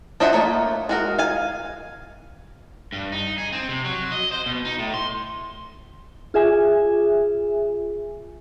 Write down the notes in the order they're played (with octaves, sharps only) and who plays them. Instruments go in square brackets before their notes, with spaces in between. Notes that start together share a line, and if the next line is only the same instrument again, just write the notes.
[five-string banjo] D4 C5 D#5 E5 F#5
A3 A#3 C#5
G#3 F#4 A#4
F5 G#5
[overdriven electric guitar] G2
D#4
G#4
C4
C3
F#3
D#5
C5
B2
D#4
A2
C6
[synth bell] F4 G#4 E5 G#5